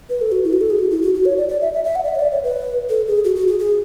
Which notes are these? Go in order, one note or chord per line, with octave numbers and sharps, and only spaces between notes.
B4
A4
F#4
E4
F#4
A4
G#4
F#4
E4
F#4
F#4
C#5
D5
D5
E5
E5
E5
F#5
D5
E5
C#5
D5
C#5
B4
A4
G#4
F#4
F#4
G#4
G#4